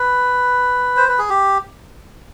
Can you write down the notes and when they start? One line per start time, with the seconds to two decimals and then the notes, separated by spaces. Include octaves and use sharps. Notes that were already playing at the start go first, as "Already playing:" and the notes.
Already playing: B4
0.97 C5
1.09 B4
1.19 G#4
1.30 G4